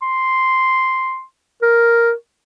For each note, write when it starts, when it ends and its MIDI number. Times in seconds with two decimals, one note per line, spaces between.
0.02 1.23 84
1.62 2.13 70